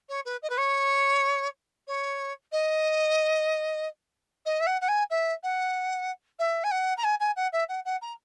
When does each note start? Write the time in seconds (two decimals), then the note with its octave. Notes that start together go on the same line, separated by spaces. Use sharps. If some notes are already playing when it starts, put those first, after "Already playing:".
0.09 C#5
0.25 B4
0.42 D#5
0.50 B4
0.58 C#5
1.88 C#5
2.52 D#5
4.46 D#5
4.61 E5
4.67 F#5
4.81 F#5
4.88 G#5
5.10 E5
5.43 F#5
6.39 E5
6.64 G#5
6.71 F#5
6.97 A#5
7.04 G#5
7.20 G#5
7.36 F#5
7.53 E5
7.69 F#5
7.85 F#5
8.02 A#5